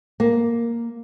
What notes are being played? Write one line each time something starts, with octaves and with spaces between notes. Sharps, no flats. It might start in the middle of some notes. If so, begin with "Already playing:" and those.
A#3